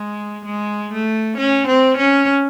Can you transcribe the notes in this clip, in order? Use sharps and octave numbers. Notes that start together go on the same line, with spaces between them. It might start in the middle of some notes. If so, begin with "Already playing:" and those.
Already playing: G#3
G#3
A3
C#4
C4
C#4